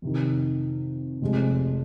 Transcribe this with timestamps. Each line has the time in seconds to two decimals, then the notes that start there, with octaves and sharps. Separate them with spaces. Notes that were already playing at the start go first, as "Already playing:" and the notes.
0.02 F2 C3 D#3
1.21 F1 F2 C3 F3 G#3